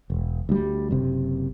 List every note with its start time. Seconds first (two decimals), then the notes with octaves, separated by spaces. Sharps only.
0.10 E1
0.49 D2 G3
0.91 F#1 C3